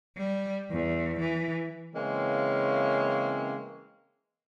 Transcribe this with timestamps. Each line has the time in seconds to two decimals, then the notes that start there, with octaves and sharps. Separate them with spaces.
0.17 G3
0.72 E2
1.20 E3
1.94 C#3 E3 G#3 A#3 C4 C#4